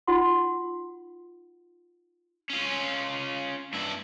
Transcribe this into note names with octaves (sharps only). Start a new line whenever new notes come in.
D#4 F4 F#4 F#5 C6
C#4 F4
G2 E4